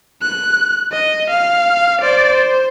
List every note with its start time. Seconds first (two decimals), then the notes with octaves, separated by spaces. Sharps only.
0.22 F#6
0.92 D#5
1.30 F5
2.01 C5 D5
2.32 C5